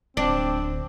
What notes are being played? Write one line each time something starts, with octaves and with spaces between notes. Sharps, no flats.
D1 C4 D4